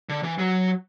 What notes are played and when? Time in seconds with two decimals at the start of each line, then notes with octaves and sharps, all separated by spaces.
0.09 D3
0.23 E3
0.38 F#3